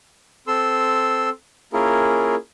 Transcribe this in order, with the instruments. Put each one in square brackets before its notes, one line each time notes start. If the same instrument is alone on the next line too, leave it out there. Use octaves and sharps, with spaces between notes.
[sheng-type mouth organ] C4 A4 C6 E6
A#3 C#4 E4 F4 G#4 A#4